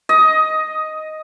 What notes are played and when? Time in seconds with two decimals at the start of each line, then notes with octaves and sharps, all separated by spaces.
0.09 D#5